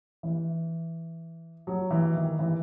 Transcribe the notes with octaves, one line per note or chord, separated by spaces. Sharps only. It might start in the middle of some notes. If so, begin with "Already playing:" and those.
E3
F#3
E3
D#3
E3